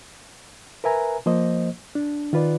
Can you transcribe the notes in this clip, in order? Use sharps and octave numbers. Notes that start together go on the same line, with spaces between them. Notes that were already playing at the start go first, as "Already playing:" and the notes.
A#4 B4 E5 G#5 A#5
F3 A#3 C5 D#5
D4
D#3 F4 B4 D5